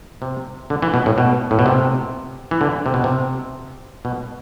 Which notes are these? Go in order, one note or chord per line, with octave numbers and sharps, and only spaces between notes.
C3
D3
E3
B2
A2
B2
A2
B2
C3
E3
D3
C3
B2
C3
B2